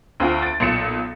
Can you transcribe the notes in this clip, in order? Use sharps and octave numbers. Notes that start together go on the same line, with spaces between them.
D2 C4 F4
A6 D7
B1 A#2 C#7 E7